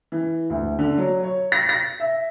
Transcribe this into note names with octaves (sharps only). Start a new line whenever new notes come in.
E3
D2
D3
F#3
C#5
A#6
A#6
E5